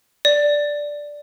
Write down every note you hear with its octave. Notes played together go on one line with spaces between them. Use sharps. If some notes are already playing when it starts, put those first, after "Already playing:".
D5